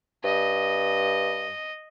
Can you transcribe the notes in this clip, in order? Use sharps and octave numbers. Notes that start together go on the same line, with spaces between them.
G2 D#5